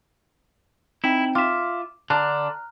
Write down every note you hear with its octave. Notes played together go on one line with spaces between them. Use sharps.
C4 D#4 E4 G5
F4 E5 D6
D3 D4 A#5 F6 F#6